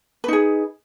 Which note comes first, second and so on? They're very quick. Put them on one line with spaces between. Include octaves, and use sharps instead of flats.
B4 D#4 G#4